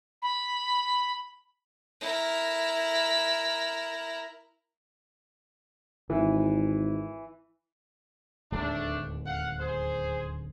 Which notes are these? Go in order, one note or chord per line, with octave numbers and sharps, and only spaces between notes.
B5
E4 A#4
G#1 E3
D1 D#2 G#3 A3 D4
F5 F#5
G#4 C5